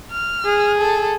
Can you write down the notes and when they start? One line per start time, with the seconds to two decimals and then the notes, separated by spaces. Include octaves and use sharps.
0.11 F6
0.45 G#4
0.78 A4